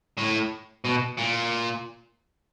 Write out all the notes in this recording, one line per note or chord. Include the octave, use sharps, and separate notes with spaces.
A2
B2
A#2